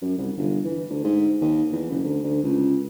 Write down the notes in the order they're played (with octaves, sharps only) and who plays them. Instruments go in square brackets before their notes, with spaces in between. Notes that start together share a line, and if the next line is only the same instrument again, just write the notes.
[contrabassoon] F#2
C2
G1
E3
D2
G#2
D#2
E2
F#1
D2
D2
C#2